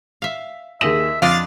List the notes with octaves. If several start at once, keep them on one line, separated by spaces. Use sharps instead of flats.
E5 F5
D#2 G#4 D#5 E5 E7
F2 D4 F4 D5 D#5 F5 A6